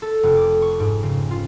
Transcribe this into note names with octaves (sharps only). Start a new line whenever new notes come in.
A4
F1
D6
C#6
G#2
C#3
F4